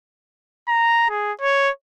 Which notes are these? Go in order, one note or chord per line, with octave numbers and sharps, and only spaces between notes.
A#5
G#4
C#5